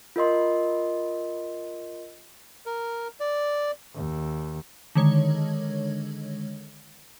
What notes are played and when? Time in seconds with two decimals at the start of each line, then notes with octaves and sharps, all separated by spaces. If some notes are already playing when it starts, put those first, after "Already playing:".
0.16 F4 A#4 D#5 C6
2.66 A#4
3.20 D5
3.96 D#2
4.95 D3 D#3 G#3 C#5